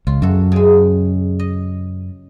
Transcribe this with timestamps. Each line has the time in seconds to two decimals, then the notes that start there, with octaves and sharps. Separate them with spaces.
0.07 C#2 F4
0.22 F#2 F#4 A4
0.52 C#3 G#3
1.39 D#5